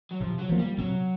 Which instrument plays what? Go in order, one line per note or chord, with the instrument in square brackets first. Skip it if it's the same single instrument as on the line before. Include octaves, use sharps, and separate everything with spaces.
[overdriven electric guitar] F#3
[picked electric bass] C3 [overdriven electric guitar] F3
[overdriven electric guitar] F#3
[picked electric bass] F3 A#3
[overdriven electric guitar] G3
[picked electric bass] C3 [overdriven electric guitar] F#3